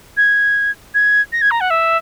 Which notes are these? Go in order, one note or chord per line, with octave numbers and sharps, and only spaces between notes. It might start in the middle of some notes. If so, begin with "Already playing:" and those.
G#6
G#6
A#6
G#6
A#5
F#5
E5